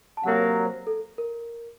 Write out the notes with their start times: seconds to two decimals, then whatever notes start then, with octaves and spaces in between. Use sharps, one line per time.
0.17 A5
0.23 C3 F#3 A#3 F#5
0.44 C#5
0.65 C5
0.87 A4
1.18 A#4